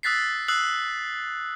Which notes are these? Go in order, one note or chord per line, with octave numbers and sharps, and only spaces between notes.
D#6 E6 F#6 A6 B6 C7
D#6 E6 F#6 C7 F#7